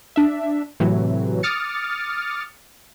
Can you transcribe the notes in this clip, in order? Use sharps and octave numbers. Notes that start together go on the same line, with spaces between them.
D4 E5
A2 C3 E3 F#3
D6 D#6 F6 A6 C#7